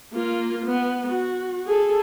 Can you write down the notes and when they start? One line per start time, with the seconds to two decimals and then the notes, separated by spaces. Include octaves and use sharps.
0.13 A#3 F4
0.66 B3
1.09 F#4
1.66 G#4 A4